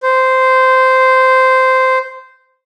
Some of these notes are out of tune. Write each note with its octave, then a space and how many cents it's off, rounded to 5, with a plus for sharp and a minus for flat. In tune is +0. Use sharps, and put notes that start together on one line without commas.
C5 -10